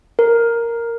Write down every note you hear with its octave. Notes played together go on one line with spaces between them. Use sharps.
A#4